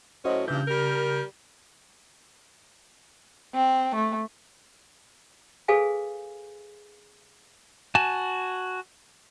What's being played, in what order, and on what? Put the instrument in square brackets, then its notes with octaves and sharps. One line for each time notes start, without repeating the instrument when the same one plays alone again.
[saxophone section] A2 F#3 C#4 [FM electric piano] F#4 C5 D#5
[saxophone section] G2 A#2 E3 [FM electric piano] C#3 G6
[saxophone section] G3 A#4
[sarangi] C4
A3
[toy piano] G#4 A4 B4 F5 G#5
[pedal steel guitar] F#4 G#5 A5